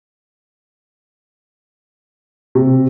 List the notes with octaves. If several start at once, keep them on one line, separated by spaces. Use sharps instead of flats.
C3